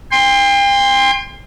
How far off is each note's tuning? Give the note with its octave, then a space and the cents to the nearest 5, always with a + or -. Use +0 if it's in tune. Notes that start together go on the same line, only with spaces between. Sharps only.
G5 +40 C6 +0